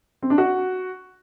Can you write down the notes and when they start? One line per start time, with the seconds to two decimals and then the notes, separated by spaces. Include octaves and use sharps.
0.22 C4
0.30 D4
0.38 F#4